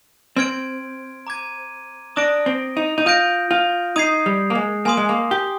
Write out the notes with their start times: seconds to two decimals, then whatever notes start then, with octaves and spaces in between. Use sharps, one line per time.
0.36 C4 C6 F6 G#6 D7
1.27 A#5 D6 G#6 D#7
2.16 D4 D#6 A#6 D7
2.46 C4
2.77 D#4
2.98 D#4
3.06 F4 D#6 G6 A#6 D7
3.51 F4
3.96 D#4 D#6 G#6 C7
4.26 G3
4.50 A#3
4.55 G#3
4.85 A#3 G#5 C6 D#6
4.97 G#3
5.09 A#3
5.31 G4